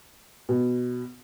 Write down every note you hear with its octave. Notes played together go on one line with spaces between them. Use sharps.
B2